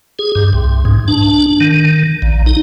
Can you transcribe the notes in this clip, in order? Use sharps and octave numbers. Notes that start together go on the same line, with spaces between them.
G#4
G2
C2
G#2
D4
D#3
A#1
D#4